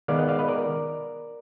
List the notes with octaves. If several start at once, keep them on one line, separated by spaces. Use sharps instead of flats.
D#3 G#3 B3 D5 F5
D#5 F#5
D5 F5
B4 D#5
A#4 D5